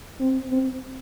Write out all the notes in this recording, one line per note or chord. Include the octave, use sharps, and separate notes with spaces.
C4
C4